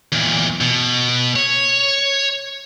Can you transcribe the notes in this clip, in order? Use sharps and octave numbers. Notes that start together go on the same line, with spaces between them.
E2 A#2
B2
C#5